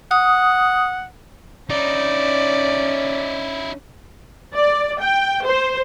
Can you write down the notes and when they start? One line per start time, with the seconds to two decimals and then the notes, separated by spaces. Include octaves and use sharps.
0.11 F#5 D#6
1.70 C#4 D#4 E4 D5
4.54 D5
5.00 G5
5.45 C5